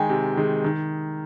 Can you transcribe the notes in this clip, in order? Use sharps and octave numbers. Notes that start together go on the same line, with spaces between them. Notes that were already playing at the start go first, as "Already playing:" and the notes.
Already playing: D#3 G#3 G5 G#5
C3
D#3 G#3
D#3